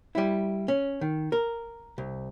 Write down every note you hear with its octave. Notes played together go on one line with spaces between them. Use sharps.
G3 E4
C#4
D#3
A#4
C2